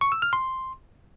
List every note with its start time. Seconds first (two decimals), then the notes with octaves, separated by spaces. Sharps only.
0.01 C#6
0.12 E6
0.22 F6
0.33 C6